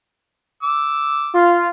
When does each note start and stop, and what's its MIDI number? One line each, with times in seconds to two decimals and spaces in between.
0.63 1.34 86
0.63 1.34 88
1.35 1.70 65